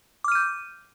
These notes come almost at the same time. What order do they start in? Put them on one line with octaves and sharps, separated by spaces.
D6 F6 D#7 G6